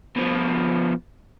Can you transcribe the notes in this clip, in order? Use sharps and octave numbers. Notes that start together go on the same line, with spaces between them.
B2 F3